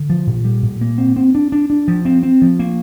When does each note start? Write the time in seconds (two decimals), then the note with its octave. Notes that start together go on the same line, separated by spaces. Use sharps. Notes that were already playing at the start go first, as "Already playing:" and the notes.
Already playing: D3
0.10 F3
0.27 A#2
0.45 G3
0.62 A#2
0.81 A#3
0.98 C4
1.16 C4
1.35 D4
1.52 D4
1.70 D4
1.88 F3
2.05 C4
2.23 C4
2.42 F3
2.59 A#3